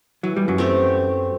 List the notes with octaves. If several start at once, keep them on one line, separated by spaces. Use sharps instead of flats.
E3 F#3
G3
F#2 F#3
A3 C4 G4